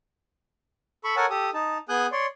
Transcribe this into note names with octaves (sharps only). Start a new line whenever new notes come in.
A4 B5 C#6
A4 A#4 C#5 F#5 G#5 A5
G4 A4 D#6
D#4 A5
B3 G#4 G#5 D#6 F#6 G6
C#5 D5 C6